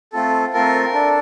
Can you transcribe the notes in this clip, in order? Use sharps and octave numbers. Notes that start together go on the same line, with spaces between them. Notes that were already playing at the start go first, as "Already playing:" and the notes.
A3 C4 F4 A4
A3 C4 F4 A4 A#4
D4 A4